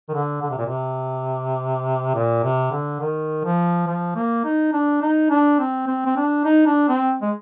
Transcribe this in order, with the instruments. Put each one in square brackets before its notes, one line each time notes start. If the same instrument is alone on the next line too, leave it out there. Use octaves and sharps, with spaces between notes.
[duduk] D#3
D3
D3
C3
A#2
C3
A#2
C3
D3
D#3
F3
F3
A#3
D#4
D4
D#4
D4
C4
C4
C4
D4
D#4
D4
C4
G#3